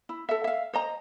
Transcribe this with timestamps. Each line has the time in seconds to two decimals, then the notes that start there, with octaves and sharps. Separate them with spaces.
0.09 E4
0.29 A4 E5
0.44 E5 F5
0.73 C5 D#5 A#5